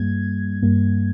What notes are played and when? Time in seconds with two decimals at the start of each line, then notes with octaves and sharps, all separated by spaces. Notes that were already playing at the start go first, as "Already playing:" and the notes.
Already playing: G2 G3 A#3 G#6
0.62 G2 G3 A#3